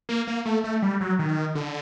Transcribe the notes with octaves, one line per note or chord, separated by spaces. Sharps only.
A#3
A#3
A3
A3
G3
F#3
D#3
D3